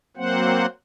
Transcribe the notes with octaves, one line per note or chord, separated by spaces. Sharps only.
F#3 A#3 C4 C5 F#5